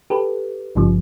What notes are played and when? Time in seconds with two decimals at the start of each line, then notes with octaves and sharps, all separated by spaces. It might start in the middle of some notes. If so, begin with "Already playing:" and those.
0.10 G4 A4 B4
0.75 G#1 G2 C#3 F3 G3